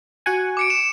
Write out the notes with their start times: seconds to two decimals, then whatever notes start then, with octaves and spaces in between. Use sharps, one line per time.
0.26 F#4 F#5 G#5
0.57 D6 C#7 D7
0.70 E7